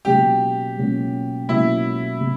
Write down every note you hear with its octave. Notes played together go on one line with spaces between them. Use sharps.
C#2 B2 F#3 A#3 C#4 G4
C#2 B2 F#3 A#3 C#4
C#2 B2 F#3 A#3 C#4 E4
B2